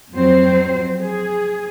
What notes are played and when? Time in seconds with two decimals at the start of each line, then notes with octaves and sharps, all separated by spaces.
0.13 F2 F#3 C4 C5
1.01 G#4